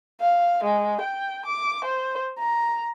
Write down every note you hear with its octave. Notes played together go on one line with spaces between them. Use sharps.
F5
G#3
G5
D6
C5
A#5